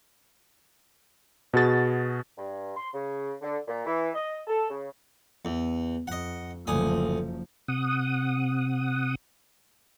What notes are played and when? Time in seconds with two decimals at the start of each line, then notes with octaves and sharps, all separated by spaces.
1.53 B2 F#4 G#4 A6
2.37 G2
2.77 C6
2.93 C#3
3.42 D3
3.67 A#2
3.86 E3
4.15 D#5
4.47 A4
4.70 C#3
5.45 E2
6.08 F2 D#5 F#5
6.67 F#1 D2 F3 G#5 D#6
7.68 C3 F#5 D#6